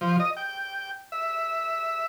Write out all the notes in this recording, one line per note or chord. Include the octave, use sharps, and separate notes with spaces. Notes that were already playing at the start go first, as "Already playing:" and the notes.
F3
D#5
G5
E5